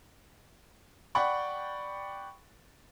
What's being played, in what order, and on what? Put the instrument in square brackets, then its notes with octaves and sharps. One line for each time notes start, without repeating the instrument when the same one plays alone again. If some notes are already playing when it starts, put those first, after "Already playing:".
[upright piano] D5 F#5 G5 B5 C#6